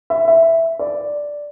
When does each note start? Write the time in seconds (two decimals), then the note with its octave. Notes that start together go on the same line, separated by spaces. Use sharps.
0.10 E5
0.28 E5
0.79 D5